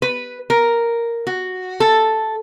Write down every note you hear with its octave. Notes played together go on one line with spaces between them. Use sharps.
B4
A#4
F#4
A4